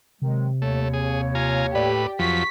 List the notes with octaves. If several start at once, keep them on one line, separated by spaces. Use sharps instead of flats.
C3 D#3 F#3 G#3
D#2 A3 C#5
G#4
F4 G#5 A#5
A2 G4 B4 D5
F2 F3 F#3 C#6 B6